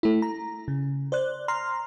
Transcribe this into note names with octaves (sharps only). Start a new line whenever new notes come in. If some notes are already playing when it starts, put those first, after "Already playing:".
A3 E4
A#5
C#3
C5 D5 F#6
A#5 C6 F6